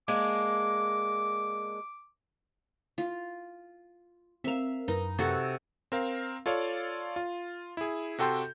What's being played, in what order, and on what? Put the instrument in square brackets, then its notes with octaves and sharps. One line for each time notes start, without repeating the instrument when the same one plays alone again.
[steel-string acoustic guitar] G#3 A#3 D4 [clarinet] D6
[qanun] F4
[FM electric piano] C4 A#4 [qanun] E5 F5
[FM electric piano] F#2 A#4 B4 [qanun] D#4
[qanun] C3 F#4 A4
[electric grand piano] C4 A#4 F5
F4 A4 C#5 D5 F5
F4
E4 G#4
C3 F#4 A4 G5 C6 G6